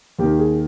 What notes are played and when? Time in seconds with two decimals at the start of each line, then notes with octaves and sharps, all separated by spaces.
0.19 D#2 D#3 G4
0.39 G#4